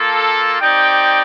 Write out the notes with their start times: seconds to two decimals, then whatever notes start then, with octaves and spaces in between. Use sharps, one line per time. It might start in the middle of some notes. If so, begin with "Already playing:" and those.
Already playing: A#3 F4 A4
0.60 C4 D#4 G4 D5 G5